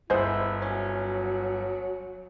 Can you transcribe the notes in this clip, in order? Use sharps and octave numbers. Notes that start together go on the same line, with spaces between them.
G1 G#3 E4 C5 F#5
F#3 C#4